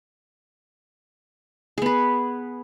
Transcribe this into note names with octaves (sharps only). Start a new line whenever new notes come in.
B3 G#4 B4